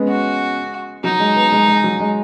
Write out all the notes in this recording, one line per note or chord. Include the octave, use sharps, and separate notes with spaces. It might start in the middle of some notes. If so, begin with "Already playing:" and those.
Already playing: G#3 B3 C#4
F#4
F#3 D#4
G#3
B3
G#3
G#3
F#3
G#3